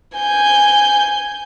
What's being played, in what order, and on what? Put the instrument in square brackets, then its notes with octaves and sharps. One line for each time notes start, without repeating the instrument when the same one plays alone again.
[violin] G#5 G6